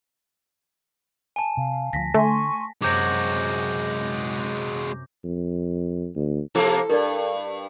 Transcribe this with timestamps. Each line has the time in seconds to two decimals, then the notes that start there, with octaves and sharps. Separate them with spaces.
1.36 G#5 A5
1.57 C3 F5
1.93 D2 D3 F3 A#6 B6
2.14 D3 A3 G#5 C6 C#6
2.82 F#2 C3 G#3 F#4 D6 G6 A#6
5.24 F2
6.16 D2
6.55 C3 F3 A#3 E4 A4 E6
6.89 G2 A#4 D5